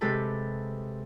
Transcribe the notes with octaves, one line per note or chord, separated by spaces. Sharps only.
C3 G#3 G4 A4 B4